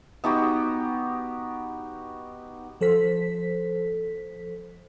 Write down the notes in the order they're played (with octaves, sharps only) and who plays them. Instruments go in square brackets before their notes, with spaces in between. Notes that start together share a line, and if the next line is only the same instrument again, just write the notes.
[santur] B3 D#4 F#4 G4
[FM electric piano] F3 A4 C5 B6